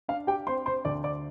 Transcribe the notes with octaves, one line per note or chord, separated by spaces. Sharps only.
D4 F5
G4 G5
C4 C5 C6
C5 C6
D2 D5 D6
D5 D6